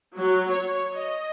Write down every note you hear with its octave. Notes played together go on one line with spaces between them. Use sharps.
F#3
C#5
D#5